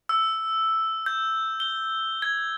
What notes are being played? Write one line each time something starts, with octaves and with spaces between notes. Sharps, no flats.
E6
G6
G7
G#6